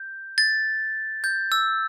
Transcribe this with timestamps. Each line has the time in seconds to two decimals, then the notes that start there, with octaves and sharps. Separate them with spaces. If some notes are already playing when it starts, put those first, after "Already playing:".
Already playing: G6
0.38 A6
1.24 G6
1.52 E6